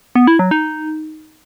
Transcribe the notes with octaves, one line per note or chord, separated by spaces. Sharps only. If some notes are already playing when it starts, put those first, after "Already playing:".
B3
E4
F#3
D#4